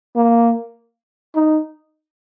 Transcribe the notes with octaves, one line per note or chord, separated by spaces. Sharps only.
A#3
D#4